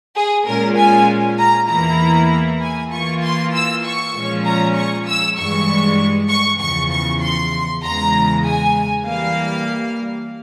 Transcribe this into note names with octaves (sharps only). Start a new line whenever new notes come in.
G#4
A#2 G#3 C#4 F4 A#4
G#5
A#5
E2 E3 A#3 E4 A#5
G#5
E3 A#3 F4 C#6
C6
E6
C#6
A#2 F3 G#3 C#4 F4
A#5
C#6
E6
G2 E3 G#3 C#6
C#6
E2 C#3 F3 C#6
C#6
C6
E2 C#3 E3 G#3 A#5
G#5
E3 G3 A#3 F5